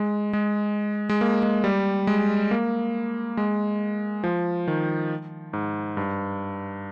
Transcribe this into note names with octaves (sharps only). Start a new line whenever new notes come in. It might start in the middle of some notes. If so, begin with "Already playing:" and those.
Already playing: G#3
G#3
G#3
A#3
G#3
G3
G#3
A#3
G#3
F3
D#3
G#2
G2